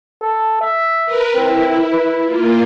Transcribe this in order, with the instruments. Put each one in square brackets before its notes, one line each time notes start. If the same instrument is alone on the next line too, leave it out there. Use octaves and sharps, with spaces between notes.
[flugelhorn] A4
E5
[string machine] A#4 B4
[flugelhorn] C4 [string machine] E4
[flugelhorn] B4
[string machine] A#3 F4